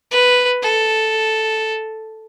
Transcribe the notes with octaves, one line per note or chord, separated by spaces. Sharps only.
B4
A4